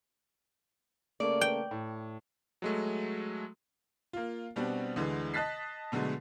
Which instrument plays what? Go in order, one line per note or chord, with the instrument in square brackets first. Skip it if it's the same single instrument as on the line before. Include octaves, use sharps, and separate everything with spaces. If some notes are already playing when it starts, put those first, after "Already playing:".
[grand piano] C#3 A3 A#3 [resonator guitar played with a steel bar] D5
[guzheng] G5
[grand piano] A2
[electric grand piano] F#3 G#3 A3
[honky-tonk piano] A#3 F4
B2 G3 B3 C4 D4 F#4
D2 D3 E3 G#3
D#5 A5 F#6 A6 B6 C7
B2 D3 F#3 G#3 A3